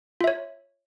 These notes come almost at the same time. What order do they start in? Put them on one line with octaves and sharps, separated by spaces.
F4 E5 C#5